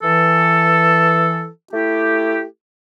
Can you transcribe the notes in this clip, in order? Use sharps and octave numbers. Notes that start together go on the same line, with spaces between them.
E3 A4
A3 E4 G4